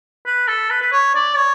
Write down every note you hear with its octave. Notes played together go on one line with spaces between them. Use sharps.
B4
A4
B4
B4
C#5
D5
C#5